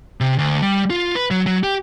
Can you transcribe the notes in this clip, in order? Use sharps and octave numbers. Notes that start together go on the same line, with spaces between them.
C3
D2
G3
F4
B4
F#3
F#3
G4